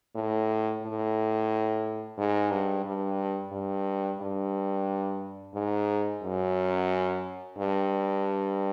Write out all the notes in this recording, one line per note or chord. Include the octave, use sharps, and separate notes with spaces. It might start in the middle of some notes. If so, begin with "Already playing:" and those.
A2
A2
G#2
G2
G2
G2
G2
G#2
F#2
G2